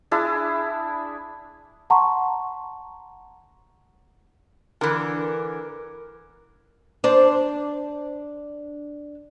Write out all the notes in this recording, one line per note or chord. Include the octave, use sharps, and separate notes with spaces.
D4 E4 G#4
F#5 A5 A#5 C6 C#6
D3 E3 A#4
D4 C5